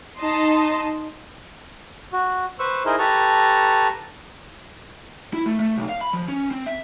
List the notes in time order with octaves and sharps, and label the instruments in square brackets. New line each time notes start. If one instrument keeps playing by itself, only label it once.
[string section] D#4 D#5 A5 C6
[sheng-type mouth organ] F#4
B4 C5 C#6 E6
D#4 E4 G#4 A#4 C5 D#5
G4 A4 B4 A5 A#5 C#6
[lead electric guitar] E4
A3
A3
B1
F5
B5
F3
C#4
C4
E5